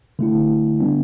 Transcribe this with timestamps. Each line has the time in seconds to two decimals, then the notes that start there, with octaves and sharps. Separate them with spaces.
0.19 D3 A3 E4
0.80 D3 G3 B3 D4